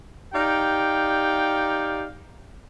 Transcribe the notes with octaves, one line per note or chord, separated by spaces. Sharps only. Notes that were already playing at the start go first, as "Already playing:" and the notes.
D#4 G4 D5 F5 G5